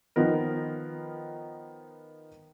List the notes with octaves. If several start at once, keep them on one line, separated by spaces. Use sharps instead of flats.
D#3 F3 B3 A#4